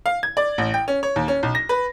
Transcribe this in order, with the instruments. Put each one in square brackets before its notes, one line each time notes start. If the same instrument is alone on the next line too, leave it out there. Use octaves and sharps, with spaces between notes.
[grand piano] F5
G#6
D5
A1
G5
C#4
C#5
D#2
C#4
B1
A#6
B4